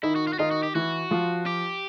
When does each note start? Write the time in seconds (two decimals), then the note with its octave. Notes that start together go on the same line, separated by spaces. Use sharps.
0.03 D#3 D#4 E4
0.16 F#4
0.27 F4
0.33 F#4
0.39 D#3 D#4 F4
0.51 F#4
0.63 G4
0.75 E3 E4 F#4
1.11 F3 F4
1.46 G4